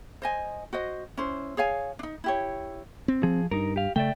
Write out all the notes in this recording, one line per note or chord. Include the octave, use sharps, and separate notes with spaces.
C5 D#5 G#5
F#4 C5 D#5
C#4 E4 C5
G#4 C#5 F5 G#5
D4 D#4
E4 G4 C#5
C4
F3 G#4
G2 D#4 A#4
G4 F5
C#3 A3 D5 E5 G5